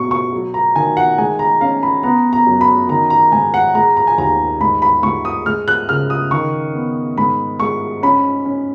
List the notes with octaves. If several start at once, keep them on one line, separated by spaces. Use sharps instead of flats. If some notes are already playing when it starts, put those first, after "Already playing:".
Already playing: B2 A#3 C#6
C#6
F#3
A#5
D#3 G#5
F#5
G#3 G#5
A#5
C#4 F5
B5
B3 A#5
A#5
F#2
B5
D#3 A#5
A#5
G#2 G#5
F#5
G#3 A#5
A#5
G#5
D#2 A#5
G#2 B5
B5
G#2 C#6
D#6
G#3 F6
F#6
C#3 F6
D#6
D#3 C#6
B3
G#2 B5
G#3 C#6
C#4 B5
C#4